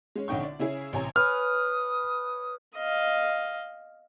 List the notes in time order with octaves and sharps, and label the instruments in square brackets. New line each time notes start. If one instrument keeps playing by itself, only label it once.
[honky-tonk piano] G#3 C#4
A#1 D3 C#4 D#4 G5 C#6
D5
C#3 C#4 E4 G#4
A1 C3 C#5 G#5 A#5
[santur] B4 C#5 G#5 [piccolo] D#6 [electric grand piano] F6
[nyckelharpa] D#5 F5